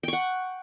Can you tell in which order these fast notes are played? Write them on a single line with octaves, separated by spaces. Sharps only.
G5 C#6 F#5